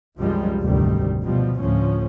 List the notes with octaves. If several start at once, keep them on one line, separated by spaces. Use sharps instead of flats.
C2 F#2 F3 G3 G#3
F1 D2 G#2 C3 D#3 G3
B2 F3 G3
D2 A2 F3 C#4